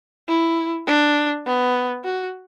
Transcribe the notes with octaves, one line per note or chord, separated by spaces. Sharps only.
E4
D4
B3
F#4